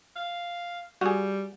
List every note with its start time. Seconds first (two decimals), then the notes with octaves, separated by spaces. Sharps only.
0.16 F5
1.01 G3 F#4 G#4